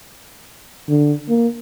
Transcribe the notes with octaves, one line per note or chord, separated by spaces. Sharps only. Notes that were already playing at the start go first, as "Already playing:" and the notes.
D3
A#3